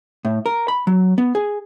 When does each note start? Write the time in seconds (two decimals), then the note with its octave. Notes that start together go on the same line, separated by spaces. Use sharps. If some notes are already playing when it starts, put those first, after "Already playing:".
0.25 A2
0.46 A#4
0.68 B5
0.87 F#3
1.18 B3
1.35 G#4